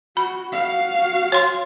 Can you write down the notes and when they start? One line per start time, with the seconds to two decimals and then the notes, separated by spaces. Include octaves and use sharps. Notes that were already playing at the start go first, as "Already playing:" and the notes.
0.17 F#4 B5
0.53 F#4 F5
1.32 C#5 C6